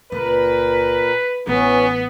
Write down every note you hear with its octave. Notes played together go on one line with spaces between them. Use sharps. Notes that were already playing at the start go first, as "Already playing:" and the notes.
C#2 A#2 A#4 B4
A1 E3 B3 C#4